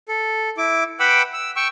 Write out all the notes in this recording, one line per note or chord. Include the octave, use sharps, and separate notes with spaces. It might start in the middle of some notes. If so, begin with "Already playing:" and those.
A4
E4 D6
B4 F#5 G5 B5 D6 E6
E6
G5 C#6 E6